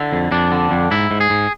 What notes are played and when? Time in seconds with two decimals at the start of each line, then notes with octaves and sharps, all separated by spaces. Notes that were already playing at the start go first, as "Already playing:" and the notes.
Already playing: D3 E4
0.13 F2
0.31 F2 D4
0.52 D3
0.71 F2
0.91 G#2 E4
1.11 G#2
1.21 G#4
1.30 G#2